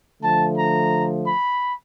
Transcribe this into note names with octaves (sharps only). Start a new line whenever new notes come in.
D3 F3 A3 A5
A#5
B5